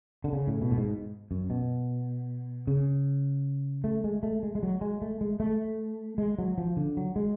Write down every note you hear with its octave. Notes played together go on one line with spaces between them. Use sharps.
D3
C#3
A2
B2
A2
G#2
F#2
B2
C#3
A3
G#3
A3
G#3
G#3
F#3
G#3
A3
G#3
A3
G#3
F#3
F3
D3
F#3
G#3